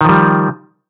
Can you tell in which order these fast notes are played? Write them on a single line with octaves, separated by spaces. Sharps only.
D#3 F3 G3